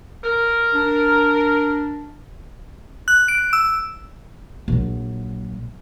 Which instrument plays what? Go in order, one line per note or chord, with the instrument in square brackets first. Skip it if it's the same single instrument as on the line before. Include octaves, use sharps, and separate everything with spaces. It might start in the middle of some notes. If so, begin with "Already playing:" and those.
[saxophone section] A#4
[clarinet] D4
[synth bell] F#6
D7
E6
[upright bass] A#1 F#3